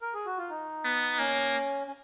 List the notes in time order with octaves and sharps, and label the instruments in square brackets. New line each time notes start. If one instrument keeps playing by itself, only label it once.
[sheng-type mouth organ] A#4
G#4
F#4
F4
D#4
[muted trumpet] B3
[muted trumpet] A#3 [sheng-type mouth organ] C#4
[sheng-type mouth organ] C#4